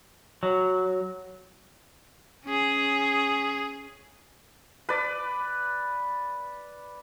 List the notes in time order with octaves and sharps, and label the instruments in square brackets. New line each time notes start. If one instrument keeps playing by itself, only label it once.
[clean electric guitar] F#3
[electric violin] C#4 G#4
[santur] B4 D5